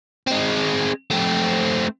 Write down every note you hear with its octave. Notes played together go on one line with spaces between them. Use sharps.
G#3 C4
A3 C4